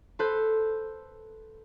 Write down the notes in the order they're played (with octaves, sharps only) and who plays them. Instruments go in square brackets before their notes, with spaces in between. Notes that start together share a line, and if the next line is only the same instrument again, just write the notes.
[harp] A4 B4 C5